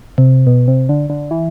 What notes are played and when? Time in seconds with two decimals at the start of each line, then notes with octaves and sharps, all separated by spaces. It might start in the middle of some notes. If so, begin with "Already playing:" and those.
0.18 C3
0.47 B2
0.68 C3
0.89 D3
1.10 D3
1.31 E3